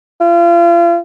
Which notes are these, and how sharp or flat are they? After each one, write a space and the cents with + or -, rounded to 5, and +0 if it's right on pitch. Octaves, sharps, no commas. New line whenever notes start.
F4 -35